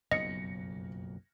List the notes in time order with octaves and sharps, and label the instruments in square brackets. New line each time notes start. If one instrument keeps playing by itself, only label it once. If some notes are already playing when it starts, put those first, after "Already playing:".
[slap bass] F#1 B1 F2 [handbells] D#5 [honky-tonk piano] A#6 C#7